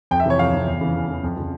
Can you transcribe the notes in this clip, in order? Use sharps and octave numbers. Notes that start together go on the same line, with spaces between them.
F2 G5
E5
C3 E3 C#5
F2 F5
C3 E3
E2
C#3 E3
E2
C#3 E3
F2
C#3 F3